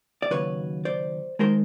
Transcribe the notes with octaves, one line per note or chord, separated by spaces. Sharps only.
D5
D#2 C#3 F#3 B4 C#5
C5 D5
D#3 G#3 A#4 C5